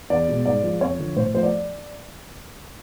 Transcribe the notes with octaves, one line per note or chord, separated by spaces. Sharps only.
E2 D5
B2 G#3
G#2 D5
F3 G#3
F2 C#5
D3 F3
A2 C5
F3 A3 C5
D5